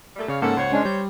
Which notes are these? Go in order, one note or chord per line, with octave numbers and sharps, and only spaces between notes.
A#2 G3 A3
C#3 C#5 D5 F5
G#2 A#3 C#4 A4 F#5
C#2 C5 C#5
G#3 C#4 D4
G3 G6